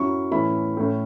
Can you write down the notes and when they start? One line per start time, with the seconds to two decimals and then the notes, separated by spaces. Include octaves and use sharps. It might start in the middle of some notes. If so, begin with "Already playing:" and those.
Already playing: F#2 F#3 C#4 E4 C#6
0.31 A2 E3 A3 C#4 E4 B5
0.77 A2 A3 C#4